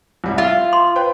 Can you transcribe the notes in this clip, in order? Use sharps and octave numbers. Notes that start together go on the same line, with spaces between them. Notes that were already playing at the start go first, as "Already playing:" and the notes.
C2 G3 E4
F4 E5
C6
B4 C5 G5